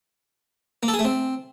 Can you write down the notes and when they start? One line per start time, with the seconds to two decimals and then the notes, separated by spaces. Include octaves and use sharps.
0.83 A#3
0.88 A4
0.94 G#4
0.99 A3
1.05 C4